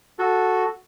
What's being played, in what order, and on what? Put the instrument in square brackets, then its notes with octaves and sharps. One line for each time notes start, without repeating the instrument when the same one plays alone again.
[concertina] F#4 A4